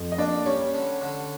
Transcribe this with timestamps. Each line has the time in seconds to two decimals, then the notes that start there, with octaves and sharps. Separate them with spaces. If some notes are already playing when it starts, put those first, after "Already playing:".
Already playing: F2
0.12 D#5
0.18 A#3 D4 D5
0.46 G3 C#4 C#5
0.74 D3
1.01 D3